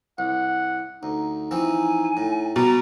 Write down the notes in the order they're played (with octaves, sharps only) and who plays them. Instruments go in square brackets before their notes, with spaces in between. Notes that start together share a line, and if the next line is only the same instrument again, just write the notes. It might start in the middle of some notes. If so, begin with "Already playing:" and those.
[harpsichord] C2 [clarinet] F#5
[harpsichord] D2 [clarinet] D#4
[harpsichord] E3 F3 C4 [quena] G#5
[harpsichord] A2
[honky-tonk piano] B2 [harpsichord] G3 [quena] A#5